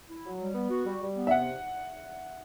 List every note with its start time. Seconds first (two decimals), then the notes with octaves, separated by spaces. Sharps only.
0.09 E4
0.25 F#3
0.39 G3
0.55 B3
0.70 F#4
0.85 G3
1.00 G3
1.15 B3
1.27 E5
1.31 C3 F#5